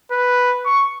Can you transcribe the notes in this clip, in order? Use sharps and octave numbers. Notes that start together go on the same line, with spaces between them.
B4
C#6